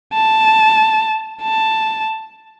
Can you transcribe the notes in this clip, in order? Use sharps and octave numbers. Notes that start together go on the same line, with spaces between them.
A5
A5